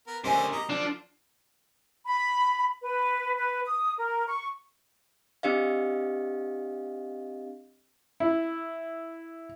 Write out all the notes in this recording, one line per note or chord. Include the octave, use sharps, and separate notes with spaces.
B3 A#4
D3 C#4 G4 A#4 C5 D#5 G#5
C4 D#5 A#5
D3 D4 F4 A5
B5
B4
B4
D#6
A#4
C#6
C4 D4 G4 D#5 F5
E4